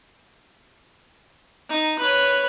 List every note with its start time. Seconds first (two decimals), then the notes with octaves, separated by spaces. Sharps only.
1.69 D#4
1.99 B4 C#5